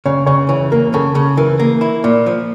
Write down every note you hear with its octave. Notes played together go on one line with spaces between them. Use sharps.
C#3 C#5
C#3 C#5
E3 C#5
A#3 A#4
C#3 A4
C#3
E3 A#4
A#3
E4
A#2
F3